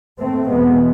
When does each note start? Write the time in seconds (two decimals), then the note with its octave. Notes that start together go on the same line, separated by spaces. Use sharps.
0.18 G#2 A3 C4
0.48 E2 B2 G#3 B3